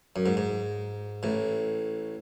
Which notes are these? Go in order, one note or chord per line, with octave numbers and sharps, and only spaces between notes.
F#2
G#2
G#2
A1 A2